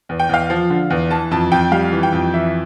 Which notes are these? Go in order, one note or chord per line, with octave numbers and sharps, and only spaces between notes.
E2
G5
E2 F5
F3
D3
E2
E3 A5
F2 A5
F2 G5
G3 F5
E3
G5
F2
E3 E5